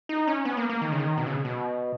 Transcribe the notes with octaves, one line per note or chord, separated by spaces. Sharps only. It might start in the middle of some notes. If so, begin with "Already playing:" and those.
D#4
C#4
B3
A#3
A#3
D#3
C#3
D#3
B2
C#3
B2